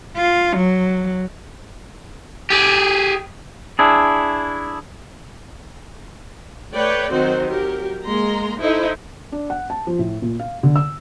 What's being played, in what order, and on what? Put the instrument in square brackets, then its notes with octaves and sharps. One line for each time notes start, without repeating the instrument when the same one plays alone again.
[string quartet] F4
F#3
[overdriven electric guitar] G4 G#4
[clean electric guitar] D4 E4 G#4
[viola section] A3 B4 C#5 D5 G5
D#3 F#3 C4 D#4 F#4 C5
F#3 G4 A#4
G#3 A#3 A#5 C6
D#4 E4 A4 C5 D#5
[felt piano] D4
F#5
A5
F3
A2
A#2
F5
D3
E6